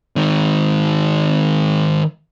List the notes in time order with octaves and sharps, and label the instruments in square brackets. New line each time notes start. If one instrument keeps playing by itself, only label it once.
[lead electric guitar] D#3 G#3